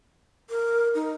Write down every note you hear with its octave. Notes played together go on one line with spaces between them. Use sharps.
A#4
D#4